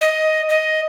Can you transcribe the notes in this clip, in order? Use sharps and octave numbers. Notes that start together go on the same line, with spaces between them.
D#5
D#5